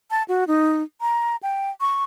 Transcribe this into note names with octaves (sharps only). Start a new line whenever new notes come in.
A5
F#4
D#4
A#5
G5
C#6